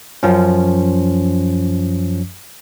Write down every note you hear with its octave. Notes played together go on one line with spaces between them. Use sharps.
F#2 F3 C#4